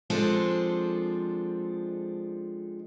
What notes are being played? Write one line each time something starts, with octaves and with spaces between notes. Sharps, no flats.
F3 G#3 C4 D4 A4